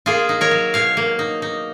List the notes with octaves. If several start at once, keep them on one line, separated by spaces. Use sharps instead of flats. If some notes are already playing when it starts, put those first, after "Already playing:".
A#3 F4 G#4
D#4
A#4 C#5
F#3
B2 C#5 F5
A#3
D#4
D#4